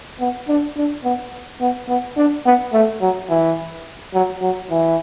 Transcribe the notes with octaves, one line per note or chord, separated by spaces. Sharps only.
B3
D4
D4
B3
B3
B3
D4
B3
A3
F#3
E3
F#3
F#3
E3